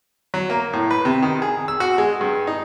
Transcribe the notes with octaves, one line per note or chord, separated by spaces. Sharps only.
F#3
A#3
A2
B4
C3
D#3
G#4
E6
F#4
G#3
G2
D#4